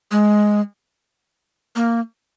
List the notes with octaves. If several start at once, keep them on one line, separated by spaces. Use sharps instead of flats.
G#3
A#3